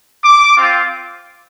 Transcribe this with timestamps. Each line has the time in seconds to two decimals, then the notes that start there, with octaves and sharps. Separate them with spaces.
0.23 D6
0.57 C4 F4